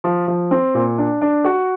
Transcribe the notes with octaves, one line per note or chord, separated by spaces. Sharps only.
F3
F3
C4
A#2
D4
D4
F#4